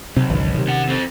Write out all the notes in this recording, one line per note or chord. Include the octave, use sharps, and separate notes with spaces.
B1 C3 C4
G#1 C#2 E3
C3 D#3
C#4 F#5
C4 A4